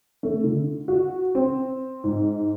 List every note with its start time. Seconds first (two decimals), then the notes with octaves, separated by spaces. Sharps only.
0.23 A3
0.44 D3
0.88 F#4
1.35 C4
2.04 G#2